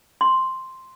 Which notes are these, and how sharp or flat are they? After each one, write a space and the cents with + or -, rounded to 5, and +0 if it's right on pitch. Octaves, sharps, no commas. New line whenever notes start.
C6 +0